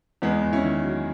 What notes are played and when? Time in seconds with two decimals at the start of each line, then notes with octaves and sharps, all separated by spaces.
0.22 E2 G#3 B3
0.43 E2
0.53 C#4 E4
0.64 D#3
0.84 F#3